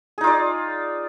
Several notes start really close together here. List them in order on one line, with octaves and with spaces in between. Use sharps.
G#4 D#4 F4 D5